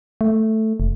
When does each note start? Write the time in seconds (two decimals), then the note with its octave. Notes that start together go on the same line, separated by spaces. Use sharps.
0.21 A3
0.80 F1